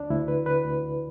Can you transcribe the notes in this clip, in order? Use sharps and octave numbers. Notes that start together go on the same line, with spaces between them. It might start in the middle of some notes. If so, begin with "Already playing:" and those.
Already playing: D2 D4
D2 E4
D3 B4
D3 B4
D2
D2